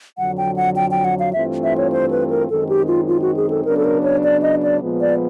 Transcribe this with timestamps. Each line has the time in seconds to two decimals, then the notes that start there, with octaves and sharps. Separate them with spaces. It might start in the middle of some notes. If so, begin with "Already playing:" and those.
0.18 F2 D3 F#3 F#5
0.38 G5
0.56 F#5
0.76 G5
0.91 G5
1.04 F#5
1.19 F5
1.33 G2 E3 A3 C4 F4 E5
1.63 E5
1.78 C#5
1.92 C5
2.11 B4
2.30 A#4
2.49 F#2 D#3 G#3 C4 D#4 A4
2.69 G4
2.88 F4
3.08 F4
3.22 F#4
3.37 G#4
3.50 A4
3.65 C#3 F#3 B3 D4 A#4
3.77 A4
3.84 A#4
4.03 C#5
4.24 D5
4.42 D#5
4.62 D5
4.81 A#2 F3 G#3 B3
5.01 D5